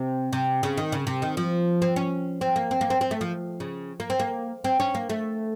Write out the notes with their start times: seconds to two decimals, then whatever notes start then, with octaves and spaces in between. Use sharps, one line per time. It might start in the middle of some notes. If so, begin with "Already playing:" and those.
Already playing: C3
0.33 C3
0.63 C#3
0.77 D#3
0.92 C#3
1.07 C3
1.22 D#3
1.37 F3
1.82 C4
1.96 C#4
2.41 C4
2.56 A#3
2.71 C4
2.81 A#3
2.90 C4
3.01 C4
3.11 A3
3.21 F3
3.60 C#3
4.00 A#3
4.10 C4
4.19 A#3
4.64 C4
4.80 C#4
4.95 A#3
5.10 A3